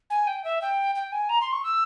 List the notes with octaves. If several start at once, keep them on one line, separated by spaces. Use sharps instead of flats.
G#5
G5
E5
G5
G5
G#5
A#5
C6
C#6
E6